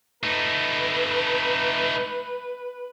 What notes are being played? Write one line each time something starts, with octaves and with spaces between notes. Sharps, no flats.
A3 D#4 B4